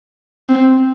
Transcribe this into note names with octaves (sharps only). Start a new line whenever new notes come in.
C4